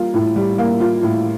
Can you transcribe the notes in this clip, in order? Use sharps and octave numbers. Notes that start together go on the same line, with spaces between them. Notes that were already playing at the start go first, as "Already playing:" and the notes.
Already playing: G3 A#3 F4
A2
G3
A#3
F4
A2